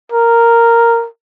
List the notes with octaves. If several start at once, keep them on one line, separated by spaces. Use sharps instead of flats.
A#4